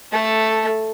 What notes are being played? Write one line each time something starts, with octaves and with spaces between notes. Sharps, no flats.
A3 A4